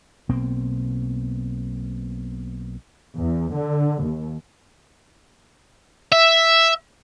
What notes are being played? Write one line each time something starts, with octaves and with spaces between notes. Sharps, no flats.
B1 B2 A#3 C4
E2
D3
D#2
E5